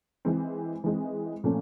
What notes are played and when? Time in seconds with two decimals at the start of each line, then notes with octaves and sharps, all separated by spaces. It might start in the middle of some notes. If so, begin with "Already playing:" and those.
0.25 E3 G#3 C4
0.84 E3 G#3 C4
1.44 A#2 F3 A3 C#4